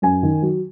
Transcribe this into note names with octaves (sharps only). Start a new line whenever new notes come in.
F#2 G#5
D#3
F#3